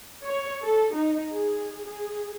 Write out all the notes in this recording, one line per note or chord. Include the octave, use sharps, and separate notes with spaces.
C#5
A4
D#4
G#4
G#4